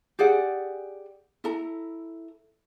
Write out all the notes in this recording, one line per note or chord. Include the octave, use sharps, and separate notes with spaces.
G4 G#4 D5 F#5
E4 A4 A#5